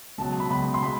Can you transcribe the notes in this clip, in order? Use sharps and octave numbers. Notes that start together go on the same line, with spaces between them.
C#2 B2 F#3 A5
B5
C#2 B2 F#3 B5
C6
B2 G#3 B5